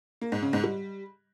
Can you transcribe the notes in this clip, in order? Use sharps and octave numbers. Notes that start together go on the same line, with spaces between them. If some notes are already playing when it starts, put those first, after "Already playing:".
A#3
G#2
C#3
G#2
G3